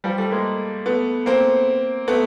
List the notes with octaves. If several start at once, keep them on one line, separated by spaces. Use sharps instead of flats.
F3 G3
G3 A3
G#3 A#3
A3 B3
A#3 C4
A3 B3